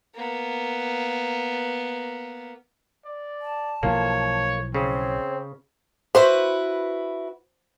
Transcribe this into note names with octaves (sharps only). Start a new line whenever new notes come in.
A#3 B3
D5
A5
B1 E3 F3 A#3 C#5
C#3 C4 C#5
E4 F#4 B4 C5